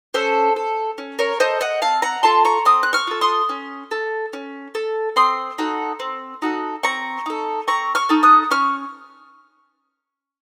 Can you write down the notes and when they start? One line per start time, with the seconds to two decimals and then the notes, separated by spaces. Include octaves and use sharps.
0.14 C#4 A4 C5
0.56 A4
0.98 C#4
1.19 A#4 C#5
1.40 A4 C5 D#5
1.61 D#5 F#5
1.82 C4 F5 A5
2.02 F#5 A#5
2.23 F4 A4 A5 C6
2.45 A#5 C#6
2.65 C4 C6 D#6
2.83 F#6
2.93 C#6 F6
3.07 F4 A4
3.21 C6 D#6
3.49 C#4
3.91 A4
4.33 C#4
4.75 A4
5.16 C4 C6 D#6
5.58 D#4 F#4 A4
6.00 C4
6.42 D#4 F#4 A4
6.83 C4 A#5 C#6
7.26 D#4 A4
7.67 C4 A#5 C#6
7.95 C#6 F6
8.09 D#4 A4
8.23 D#6 F#6
8.51 C#4 C#6 F6